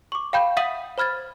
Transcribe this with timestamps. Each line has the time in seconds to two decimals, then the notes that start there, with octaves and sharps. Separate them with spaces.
0.12 C#6 D6
0.33 F5 G5 B5 G6
0.57 E5 F#5 D#6 B6 D#7 F#7
0.98 C5 B5 F6 G#6 A6